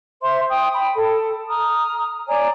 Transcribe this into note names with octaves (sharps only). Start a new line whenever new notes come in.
C5 E5 C6
G5 D#6
G5 B5
A4
A#5 D#6 F6
C#5 D5 G#5 A#5